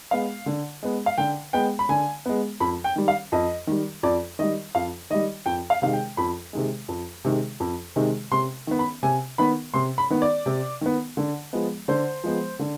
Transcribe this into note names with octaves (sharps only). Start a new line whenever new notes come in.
G#3 B3 F5
D3
G#3 B3
F5
D3 G5
G#3 B3 G5
B5
D3 G#5
G#3 B3
F2 B5
G5
D#3 G3
F5
F2 D#5
D#3 G3
F2 D5
D#3 G3 D#5
F2 F5
D#3 G3 D#5
F2 G5
F5
C3 D#3 G#3 F5
G5
F2 B5
C3 D#3 G#3
F2
C3 D#3 G#3
F2
C3 D#3 G#3
C3 C6
D#3 B3
B5
C3 G#5
D#3 B3 B5
C3 C6
B5
D#3 B3
D5
C3
D#3 B3
D3
F3 G#3 B3
D3 C5
F3 G#3 B3
D3